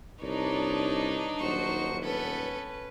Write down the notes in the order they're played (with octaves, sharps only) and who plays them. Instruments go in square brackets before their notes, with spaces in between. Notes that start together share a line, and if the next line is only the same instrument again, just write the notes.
[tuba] C2 [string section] D4 D#4 [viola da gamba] B4 C#5 D5
[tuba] D#1 [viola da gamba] F#3 F#4 C5 [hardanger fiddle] C#6
[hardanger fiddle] B3 A4 [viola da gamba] C#4 B4